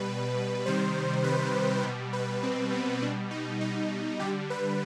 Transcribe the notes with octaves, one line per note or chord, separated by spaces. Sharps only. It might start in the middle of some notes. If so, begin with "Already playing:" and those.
Already playing: B2 G3 B4
C3 D#3 G3 C5
B4
B2 G3
B4
C4
B3
B2 G3 D4
D#4
D#4
D3 G3 G4
B4